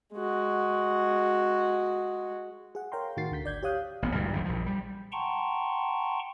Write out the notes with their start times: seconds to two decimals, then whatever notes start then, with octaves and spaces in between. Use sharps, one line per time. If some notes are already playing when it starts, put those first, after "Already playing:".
0.14 G#3 F#4
2.75 G#4 F#5
2.92 A#4 C#5 F5 G5 A#5 C6
3.17 A2 D#3 F#4 A6 C7
3.31 D2 D3 G6 B6
3.44 G#1 D5 G6 G#6
3.63 G4 C#5 F5 D#6 F#6
4.02 A1 B3
4.15 D2 G2 A#2 E3
4.33 G#1 F#2 E3
4.45 A#1 F3
4.66 G3
5.12 F#5 G5 A5 A#5 C6 C#6